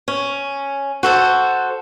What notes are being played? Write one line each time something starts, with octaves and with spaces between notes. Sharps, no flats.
C#4
F#4 A4 C5